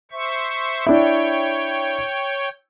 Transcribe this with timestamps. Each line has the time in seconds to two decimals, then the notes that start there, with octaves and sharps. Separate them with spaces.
0.12 C5 E5 C#6
0.87 D4 E4 C#5 G5